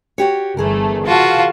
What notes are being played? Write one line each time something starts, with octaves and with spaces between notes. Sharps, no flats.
F#4 G4 C#5
G1 E3 A3 G#4 A#4
F4 F#4 F5 A5